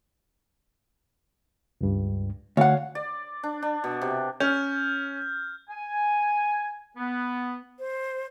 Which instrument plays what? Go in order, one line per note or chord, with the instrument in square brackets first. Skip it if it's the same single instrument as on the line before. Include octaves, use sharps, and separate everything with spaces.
[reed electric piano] C#2 G2
[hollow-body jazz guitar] D2 F#5 [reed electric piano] C#5 F5
[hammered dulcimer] D5
D4
D4
B2
C3
[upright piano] C#4 [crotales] F6 G6
[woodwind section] G#5
B3
[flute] C5